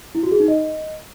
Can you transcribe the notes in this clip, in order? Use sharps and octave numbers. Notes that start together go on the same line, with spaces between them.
E4
F#4
G#4
D#4
D#5